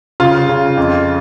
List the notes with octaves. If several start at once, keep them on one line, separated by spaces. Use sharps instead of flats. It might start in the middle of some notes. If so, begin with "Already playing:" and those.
C#3 F4
C#3
F2